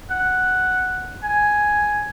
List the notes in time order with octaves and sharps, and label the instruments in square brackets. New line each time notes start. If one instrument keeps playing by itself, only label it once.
[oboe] F#5
G#5